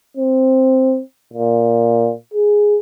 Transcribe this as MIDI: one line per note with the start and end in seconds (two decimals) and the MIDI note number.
0.17 1.01 60
1.34 2.12 46
2.34 2.79 68